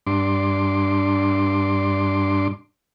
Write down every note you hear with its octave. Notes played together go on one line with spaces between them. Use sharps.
G2 D4 C6 D6